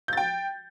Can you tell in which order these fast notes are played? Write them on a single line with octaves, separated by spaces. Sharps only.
G6 A6 G5